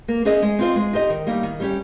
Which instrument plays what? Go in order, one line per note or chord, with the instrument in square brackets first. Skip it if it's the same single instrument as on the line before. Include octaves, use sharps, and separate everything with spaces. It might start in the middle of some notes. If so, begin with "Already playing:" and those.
[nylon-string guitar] A#3
C#4 G#4 C5 D#5
G#3
C4 F4 C5 D#5
G#3
D#4 G4 C5 D#5
D#3
G3 A#3 D#4 G4
D#3
G3 C#4 G4